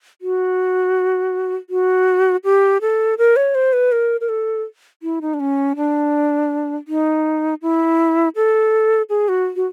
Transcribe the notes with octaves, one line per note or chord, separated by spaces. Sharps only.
F#4
F#4
G4
A4
A#4
C#5
C5
B4
A#4
A#4
A4
E4
D#4
D4
C#4
D4
D#4
E4
A4
G#4
F#4
F#4